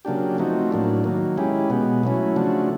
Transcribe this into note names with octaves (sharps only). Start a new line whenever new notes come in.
C#3 F#3 A#3 D4 G4
F3 A3 C4 D#4 F#4
A2 F#3 A#3 D4
D#3 F#3 A#3
G#3 C#4 E4 G4
B2 G#3 B3
F#3 A3 C#4 E4
C#3 F3 A3 D4 F#4